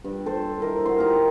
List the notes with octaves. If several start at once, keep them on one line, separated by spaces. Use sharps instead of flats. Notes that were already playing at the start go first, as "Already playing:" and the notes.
G2
A4 C5
E4 A#4 D#5
F#4 C6
D#4 G4 F5